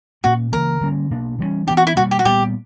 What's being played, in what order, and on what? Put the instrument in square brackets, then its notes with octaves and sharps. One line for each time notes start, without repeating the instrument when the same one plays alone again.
[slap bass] A#2 A#3 C#4 [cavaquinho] F#4
[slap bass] C#3 E3 A#3 [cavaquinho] A#4
[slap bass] D3 G3 A#3 C#4
B2 A#3 D4
E3 G3 A#3 C#4
[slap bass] E3 B3 D4 [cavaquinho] G4
[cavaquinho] F#4
E4
[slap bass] B2 G3 A#3 [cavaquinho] F#4
[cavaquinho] G4
F#4
[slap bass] A#2 G3 B3 [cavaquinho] G4